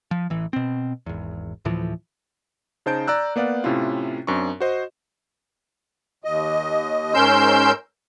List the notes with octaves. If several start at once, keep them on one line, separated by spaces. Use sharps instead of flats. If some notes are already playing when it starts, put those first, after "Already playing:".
F3
A1 E3
B2 C4
G#1 E2
D2 A2 E3 F3
C#3 D#4 C5 A5 G6 D7
D5 A#5 E6 F#6
A#3 B3 D5 F5 F#5
A2 C3 C#4 E4 F4
F#2 C4 D4 C#6
F#4 C5 D#5
D#2 D#5
G#2 C#4 A#4 C6 E6 G6